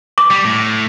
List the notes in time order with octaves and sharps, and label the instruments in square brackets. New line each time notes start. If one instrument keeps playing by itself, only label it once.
[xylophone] D6
[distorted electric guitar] G3
A2